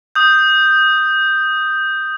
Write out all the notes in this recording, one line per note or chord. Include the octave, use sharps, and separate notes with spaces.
D#6 G6